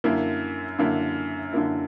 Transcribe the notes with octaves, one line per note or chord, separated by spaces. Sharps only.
F#2 D3 A#3 E4
F#2 D3 A#3 E4
F#2 D3 A#3 E4